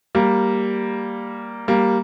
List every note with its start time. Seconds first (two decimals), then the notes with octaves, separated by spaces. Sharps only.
0.15 G3 A#3
1.68 G3 A#3